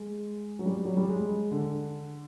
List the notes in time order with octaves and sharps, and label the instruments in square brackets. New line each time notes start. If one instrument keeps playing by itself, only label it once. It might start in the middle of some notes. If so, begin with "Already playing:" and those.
Already playing: [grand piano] G#3
F#3
G3
F#3
G3
G#3
D3